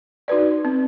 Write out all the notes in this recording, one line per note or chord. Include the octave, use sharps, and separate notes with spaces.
D#4 F#4 B4 D5
C4